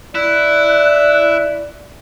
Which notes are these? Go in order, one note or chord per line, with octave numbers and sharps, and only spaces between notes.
E4 D5 F#6